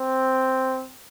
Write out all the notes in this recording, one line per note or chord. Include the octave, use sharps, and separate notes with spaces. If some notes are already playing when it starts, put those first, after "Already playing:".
Already playing: C4